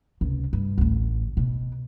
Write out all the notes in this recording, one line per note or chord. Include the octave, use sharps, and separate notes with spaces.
C#2 C3
G2
A1 D2
B2